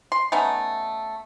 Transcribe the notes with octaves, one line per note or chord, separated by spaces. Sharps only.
C6
A3 B3 C#4 D#4